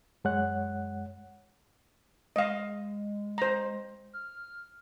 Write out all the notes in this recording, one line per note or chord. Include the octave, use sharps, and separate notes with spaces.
F#2 G#3 C#5 F#5 F#6
G#3 D#5 F5
C5 A#5
F6